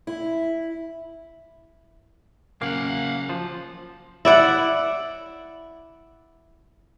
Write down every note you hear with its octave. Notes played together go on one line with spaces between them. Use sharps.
E4
C#3 F#3 A#3 F5 F#5
F3
E4 D5 F#5